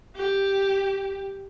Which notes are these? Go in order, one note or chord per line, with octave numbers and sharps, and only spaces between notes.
G4